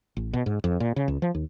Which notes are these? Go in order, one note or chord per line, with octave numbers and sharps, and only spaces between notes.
A1
B2
G#2
F2
A#2
C#3
C#2
F3
D#2